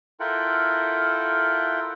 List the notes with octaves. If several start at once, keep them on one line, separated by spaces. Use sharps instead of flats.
E4 F4 A4 A#4 F#5 G5